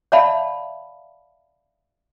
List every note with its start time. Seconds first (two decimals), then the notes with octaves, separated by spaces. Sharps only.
0.12 C#5 D5 E5 F5 A5 B5